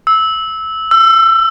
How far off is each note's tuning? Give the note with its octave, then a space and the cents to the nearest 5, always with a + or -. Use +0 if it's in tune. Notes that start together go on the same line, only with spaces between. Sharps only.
E6 -15
E6 +25